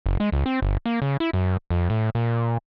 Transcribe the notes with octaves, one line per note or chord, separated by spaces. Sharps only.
F#1
G#3
C#2
C4
G1
A#3
C#3
E4
F#2
F2
A2
A#2